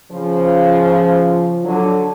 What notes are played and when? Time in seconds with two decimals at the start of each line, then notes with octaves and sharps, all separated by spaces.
0.11 C#3 F3
1.63 D3 F#3